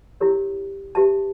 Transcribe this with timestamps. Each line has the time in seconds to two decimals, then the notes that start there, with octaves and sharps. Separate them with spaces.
0.20 E4 G4 A#4 C#5
0.95 G4 B4 E5 A5